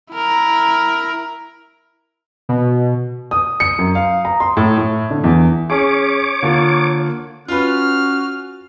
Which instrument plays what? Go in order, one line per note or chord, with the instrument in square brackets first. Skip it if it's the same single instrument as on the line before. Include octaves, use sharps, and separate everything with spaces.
[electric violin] E4 A#4
[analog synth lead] B2
[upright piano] D#6
C#7
F#2
F5
A#5
C6
A2
A2
D3
E2
[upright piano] C#4 G#4 [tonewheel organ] C#5 D6
[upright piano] D3 A#3 F4
[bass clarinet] C#4 [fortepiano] F4 B4 [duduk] F#4 [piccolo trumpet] F6